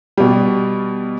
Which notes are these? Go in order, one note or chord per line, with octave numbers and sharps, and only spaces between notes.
B2 G3